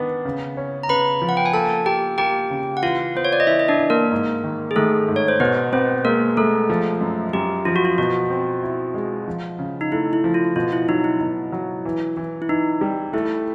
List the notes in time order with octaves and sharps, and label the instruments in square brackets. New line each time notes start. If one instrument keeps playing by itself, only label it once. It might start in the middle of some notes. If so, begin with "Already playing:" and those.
Already playing: [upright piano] D#3 B3 D4
C#3
C#4
[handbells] A#5
[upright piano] C#3 [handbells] B4 B5
[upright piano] F3
[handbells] F#5
G5
G#5
[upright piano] A#3 [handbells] A4 A5
[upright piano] A#3 [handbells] G4 G5
[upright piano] A#3 [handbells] G4 G5
[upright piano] C#3
[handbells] F#5
[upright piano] E3 [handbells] F4 F5
[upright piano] B3 [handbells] C5
[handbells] C#5
D5
D#5
[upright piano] E3 [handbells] E4 E5
[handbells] D#5
D4 D5
[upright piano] E3
[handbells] A#3 A#4
[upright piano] G#2
D#3
[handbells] G#4
[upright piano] D#3 [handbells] A3 A4
[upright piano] G#2
[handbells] C#5
C5
[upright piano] B2 [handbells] B3 B4
[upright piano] B3 [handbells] C4 C5
[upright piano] G#3 [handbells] A#3 A#4
[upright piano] G#3 [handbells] A3 A4
[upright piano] F3
F#2
[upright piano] F#2 [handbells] G4
[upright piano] F3 [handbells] F4
[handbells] F#4
F4
[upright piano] B2 [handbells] F#4
[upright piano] C4
E4
G#3
F3
C#3
[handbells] D#4
[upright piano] A3 [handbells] E4
[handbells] E4
[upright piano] F3
[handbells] F4
[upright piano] B2 [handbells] F4
[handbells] E4
[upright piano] F#3 [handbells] D#4
[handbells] E4
[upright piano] B2
F#3
E3
E3
[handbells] E4
[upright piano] E3 [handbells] D#4
[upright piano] G3
[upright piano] A3 [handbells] E4